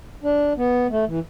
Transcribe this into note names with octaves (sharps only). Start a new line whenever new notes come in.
D4
B3
A3
E3